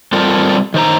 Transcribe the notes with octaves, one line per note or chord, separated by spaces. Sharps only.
G3 C4 F4 A4 A#4 C5
D#3 C5 A#5